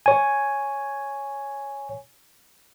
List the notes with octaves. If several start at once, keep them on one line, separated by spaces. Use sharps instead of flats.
C#5 G#5